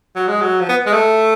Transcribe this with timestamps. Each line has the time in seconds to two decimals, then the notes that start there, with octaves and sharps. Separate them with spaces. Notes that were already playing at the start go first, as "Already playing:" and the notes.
0.16 F#3
0.28 G#3
0.41 F#3
0.61 F3
0.69 B3
0.86 G#3
0.94 A3